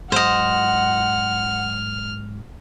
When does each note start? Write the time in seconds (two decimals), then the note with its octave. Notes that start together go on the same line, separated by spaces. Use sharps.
0.12 G#2 F#3 C5 D#5 F#5 C6 F6